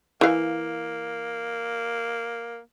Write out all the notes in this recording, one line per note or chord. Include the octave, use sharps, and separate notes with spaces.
E3 A#3 F5